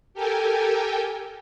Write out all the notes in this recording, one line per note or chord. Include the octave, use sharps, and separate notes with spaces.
G4 A4 A#4 G5 G#5